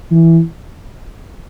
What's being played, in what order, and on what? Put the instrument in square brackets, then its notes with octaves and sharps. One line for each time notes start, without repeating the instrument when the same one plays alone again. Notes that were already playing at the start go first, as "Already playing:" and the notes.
[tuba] E3